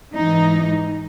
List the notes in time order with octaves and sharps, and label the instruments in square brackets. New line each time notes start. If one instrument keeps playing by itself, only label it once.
[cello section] G#2 E3 D#4